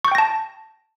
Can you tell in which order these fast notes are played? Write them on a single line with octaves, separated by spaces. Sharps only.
C#6 G6 G5 A#6 A5